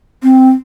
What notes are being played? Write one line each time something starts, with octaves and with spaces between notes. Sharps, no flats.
C4